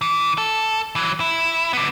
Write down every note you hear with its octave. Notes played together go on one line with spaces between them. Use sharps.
E3
A4
E3 F#3
E4
D3 B3